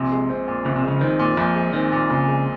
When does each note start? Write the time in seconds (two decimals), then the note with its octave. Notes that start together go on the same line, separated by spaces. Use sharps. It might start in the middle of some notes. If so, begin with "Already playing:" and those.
Already playing: A#1 C3
0.12 G#3
0.30 C4
0.48 A#2
0.65 A#1 C#3
0.76 C3
0.84 C#3 G#3
1.01 D#3 C4
1.19 A#2
1.37 A#1 F3
1.56 G#3
1.73 D#3 C4
1.92 A#2
2.10 A#1 C#3
2.28 G#3